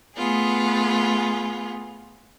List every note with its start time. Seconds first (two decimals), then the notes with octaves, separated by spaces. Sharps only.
0.15 A3 B3 F4 G#4